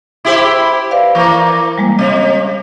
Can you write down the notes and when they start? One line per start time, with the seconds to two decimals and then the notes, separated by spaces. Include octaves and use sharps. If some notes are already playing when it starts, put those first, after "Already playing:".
0.25 E4 G4 C5
0.91 B4 D5 F5
1.15 E3 A#3
1.78 G3 G#3 A#3
1.99 C3 D#5